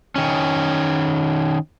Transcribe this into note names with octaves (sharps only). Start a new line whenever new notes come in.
D#3 C#4